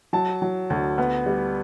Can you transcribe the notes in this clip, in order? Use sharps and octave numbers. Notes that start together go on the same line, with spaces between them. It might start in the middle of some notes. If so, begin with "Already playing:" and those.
F#3 A5
F#3
D2
B3
G3